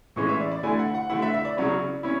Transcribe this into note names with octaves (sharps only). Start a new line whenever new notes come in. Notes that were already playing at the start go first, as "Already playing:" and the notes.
A2 E3 G#3 C#4 C#6
E5
D5
D5
D3 A3 E4 G#5
F#5
F#5
D3 A3 E4 F#5
E5
E5
D5
C#3 F#3 C#4 E4
C#4 E4